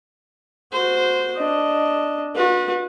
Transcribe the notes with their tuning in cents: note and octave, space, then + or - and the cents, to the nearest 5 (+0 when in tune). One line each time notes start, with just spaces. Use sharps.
F#4 -25 C5 -15
D4 +0 D#5 +0
F#4 -45 B4 -25